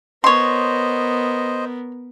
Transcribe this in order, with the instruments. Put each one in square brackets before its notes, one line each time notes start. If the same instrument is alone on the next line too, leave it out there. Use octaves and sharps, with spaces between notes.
[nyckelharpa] B3 A#4 [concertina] C5 D#5 [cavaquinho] C#5 C6